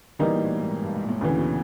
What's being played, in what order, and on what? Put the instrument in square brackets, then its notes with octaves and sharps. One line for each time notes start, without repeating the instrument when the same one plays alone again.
[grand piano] B2 [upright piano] E3 G3 A#3 D#4
[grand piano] A#2
A2
G#2
G#2
G2
G#2
A#2
A2
[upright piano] D2 C#3 E3 [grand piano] A#2
[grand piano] B2